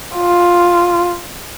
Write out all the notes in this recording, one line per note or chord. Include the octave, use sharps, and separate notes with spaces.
F4